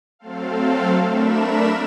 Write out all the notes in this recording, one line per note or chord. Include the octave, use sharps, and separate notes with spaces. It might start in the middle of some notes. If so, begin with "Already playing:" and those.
F#3 A3 C4 A4 F5
A3 D4 A#4 E5 B5 E7